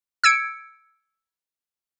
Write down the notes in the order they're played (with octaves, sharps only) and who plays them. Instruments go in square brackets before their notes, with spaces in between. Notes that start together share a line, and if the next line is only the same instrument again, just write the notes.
[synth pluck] E6 G#6 C#7 D7